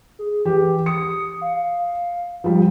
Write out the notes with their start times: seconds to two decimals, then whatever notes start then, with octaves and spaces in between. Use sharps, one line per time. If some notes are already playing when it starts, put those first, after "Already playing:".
0.19 G#4
0.45 E3 G4
0.86 D#6 C#7
1.41 F5
2.44 F3 G3